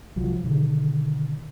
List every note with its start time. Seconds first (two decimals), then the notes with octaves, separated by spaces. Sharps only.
0.16 C2 F3 F#3
0.44 B2 D3 D#3